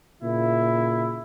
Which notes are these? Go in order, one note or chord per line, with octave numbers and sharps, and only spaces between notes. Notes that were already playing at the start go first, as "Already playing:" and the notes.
A#2 C#3 E4